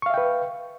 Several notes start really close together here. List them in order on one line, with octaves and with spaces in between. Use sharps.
C#6 F5 E5 G5 B4